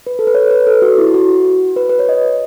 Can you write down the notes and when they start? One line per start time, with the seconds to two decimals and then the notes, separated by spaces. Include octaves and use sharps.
0.07 B4
0.19 A4
0.27 B4
0.34 C#5
0.51 B4
0.67 A4
0.82 F#4
0.98 E4
1.14 F#4
1.76 B4
1.89 B4
1.99 C#5
2.09 D#5